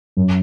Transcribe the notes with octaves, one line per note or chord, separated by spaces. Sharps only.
F#2